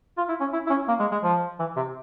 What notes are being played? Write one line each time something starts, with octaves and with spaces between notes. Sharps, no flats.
F4
E4
C#4
E4
E4
C#4
A#3
G#3
G#3
F3
E3
C3